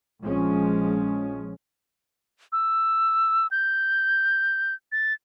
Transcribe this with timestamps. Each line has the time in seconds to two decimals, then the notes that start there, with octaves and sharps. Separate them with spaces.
0.22 A#1 F3 G#3 C#4
2.52 E6
3.51 G6
4.92 A6